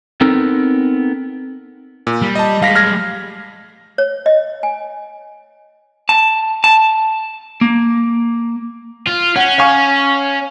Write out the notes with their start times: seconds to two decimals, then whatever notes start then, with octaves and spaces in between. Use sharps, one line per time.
0.21 B3 C4 D#4 A4 A#4
2.07 A#2
2.22 G3
2.35 D#5 A5
2.62 G3 G#3 F5 A#6 B6
2.76 F6 G#6 A#6
3.98 C#5
4.26 D#5
4.63 G#5
6.09 A5
6.64 A5
7.61 A#3
9.07 F4
9.36 C#4 F#5
9.58 F5 G#5 C#6